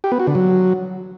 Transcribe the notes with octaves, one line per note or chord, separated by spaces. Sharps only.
G4
B3
F#4
D3
F#3